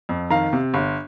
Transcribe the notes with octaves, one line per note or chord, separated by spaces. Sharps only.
F2
D#3 F5 A#5
C3
G1